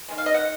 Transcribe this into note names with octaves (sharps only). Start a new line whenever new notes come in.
D#3 G#3
F5
D#5
F#5